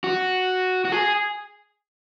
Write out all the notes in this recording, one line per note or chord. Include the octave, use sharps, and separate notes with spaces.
F#4
F#4
G#4